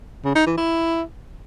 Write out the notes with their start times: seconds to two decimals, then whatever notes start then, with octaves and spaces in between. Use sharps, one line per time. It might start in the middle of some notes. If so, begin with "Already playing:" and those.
0.24 C#3
0.35 D#4
0.46 E3
0.57 E4